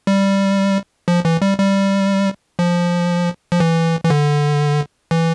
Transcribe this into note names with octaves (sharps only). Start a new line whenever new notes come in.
G3
F3
E3
G3
G3
F3
F3
E3
E3
D3
E3